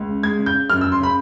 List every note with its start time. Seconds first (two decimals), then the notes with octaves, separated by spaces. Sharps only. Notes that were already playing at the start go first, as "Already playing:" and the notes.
Already playing: C#2
0.09 C#3
0.23 G#3 G#6
0.39 C#3
0.46 G6
0.54 C#3
0.70 F#2 F6
0.81 E6
0.84 F#2
0.92 C6
1.00 C#3 B5